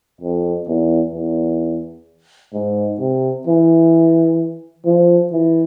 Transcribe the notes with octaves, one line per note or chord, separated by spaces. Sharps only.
F2
E2
E2
G#2
C3
E3
F3
E3